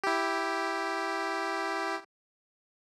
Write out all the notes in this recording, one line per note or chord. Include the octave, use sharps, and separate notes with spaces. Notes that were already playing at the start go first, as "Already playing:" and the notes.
E4 G4